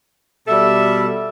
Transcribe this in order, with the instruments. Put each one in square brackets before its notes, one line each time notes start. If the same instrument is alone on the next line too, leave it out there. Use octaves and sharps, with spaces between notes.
[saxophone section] B2 G3 A4 E5